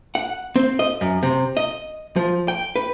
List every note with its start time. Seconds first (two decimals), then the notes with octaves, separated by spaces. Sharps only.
0.15 F#5
0.56 C4
0.79 D#5
1.01 F#2
1.23 C3
1.57 D#5
2.16 F3
2.48 G5
2.76 B4